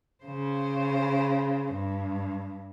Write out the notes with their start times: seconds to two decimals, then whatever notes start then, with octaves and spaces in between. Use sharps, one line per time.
0.24 C#3 C5
1.74 G2